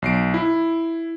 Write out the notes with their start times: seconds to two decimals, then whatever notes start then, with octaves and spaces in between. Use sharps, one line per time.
0.02 B1 C7 D7
0.34 E4